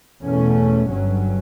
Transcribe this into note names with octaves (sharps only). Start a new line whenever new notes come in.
E2 B2 A3 C#4
G1 G2 F#3 C#4